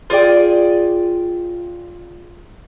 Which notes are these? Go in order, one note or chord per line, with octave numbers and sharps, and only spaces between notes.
F4 G#4 D5 G5